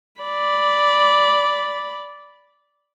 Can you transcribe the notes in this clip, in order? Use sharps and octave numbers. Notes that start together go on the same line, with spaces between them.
D5 B5